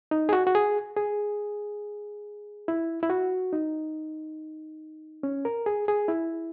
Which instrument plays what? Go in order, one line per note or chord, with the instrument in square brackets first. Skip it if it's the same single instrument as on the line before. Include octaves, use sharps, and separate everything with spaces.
[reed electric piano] D#4
G#4
F#4
F#4
G#4
G#4
E4
E4
F#4
D#4
C#4
A#4
G#4
G#4
E4